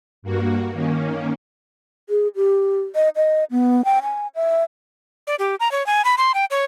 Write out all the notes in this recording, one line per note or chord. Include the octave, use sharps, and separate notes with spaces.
G2 A#3 F#4
D#3 A#3 C#4
G#4
G4
D#5
D#5
B3
G5
G#5
E5
D5
G4
A#5
C#5
G#5
B5
C6
G5
C#5